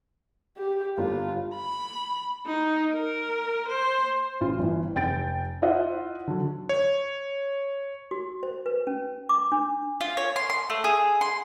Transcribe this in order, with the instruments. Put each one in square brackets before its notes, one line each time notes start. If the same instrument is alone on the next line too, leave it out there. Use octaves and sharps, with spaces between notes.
[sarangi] G4
[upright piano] G1 [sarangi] F4
[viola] B5
D#4
A#4
C5
[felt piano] A1 F4
G1 E3
F1 G5 A6 D7
E4 F4 C5 D#5 E5 F#5
D3 F#3
[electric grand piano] C#5
[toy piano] F#4
C5
B4
C#4
D6
D4
[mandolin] F4
C#5
C6
C6
A3
G#4
C6